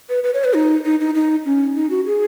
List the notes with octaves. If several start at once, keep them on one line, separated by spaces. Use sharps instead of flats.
B4
B4
C#5
B4
D#4
D#4
D#4
D#4
C#4
D#4
F#4
G#4